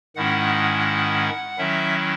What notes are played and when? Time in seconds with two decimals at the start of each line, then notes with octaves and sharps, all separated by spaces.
0.16 G#2 D#3 G#3 C#4 E4 F#5
0.87 F#5
1.58 D#3 F#3 C#4 E4 E5